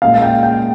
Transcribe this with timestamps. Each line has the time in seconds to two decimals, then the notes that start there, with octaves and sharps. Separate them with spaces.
0.02 A#2 G#3 C#4 F5
0.22 G5
0.43 G5